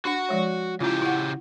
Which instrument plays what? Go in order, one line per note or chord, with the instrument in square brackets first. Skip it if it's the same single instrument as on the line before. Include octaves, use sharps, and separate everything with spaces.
[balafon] D4 [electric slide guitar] F#4 F#5
[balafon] F3 G#3 C#5
[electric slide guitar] C#3 G4 [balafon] C#4 E4 F4
[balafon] E4 F#5